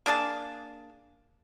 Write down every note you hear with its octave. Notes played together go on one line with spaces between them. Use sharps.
A#3 D4 G#4 A5